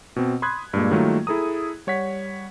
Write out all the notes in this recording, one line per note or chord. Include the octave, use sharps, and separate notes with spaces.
B2 C4
B5 C6 D#6 F#6 G#6
G2 A#2 G#3 A#3
D#3 F#3 G3 A3 A#3 F4
E4 G#4 A4 A#5 D#6
G3 C#5 F#5 B6